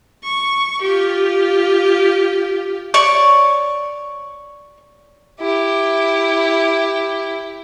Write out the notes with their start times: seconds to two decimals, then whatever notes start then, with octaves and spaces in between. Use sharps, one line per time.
0.24 C#6
0.82 F4 G4
2.94 C#5 D5 C#6
5.40 E4 G4